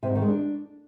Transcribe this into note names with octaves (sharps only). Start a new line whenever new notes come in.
C3
G#2
D#3
G#3
D4